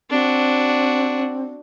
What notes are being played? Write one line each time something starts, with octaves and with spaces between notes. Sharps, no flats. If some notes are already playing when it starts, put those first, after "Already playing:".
C4 D4 F#4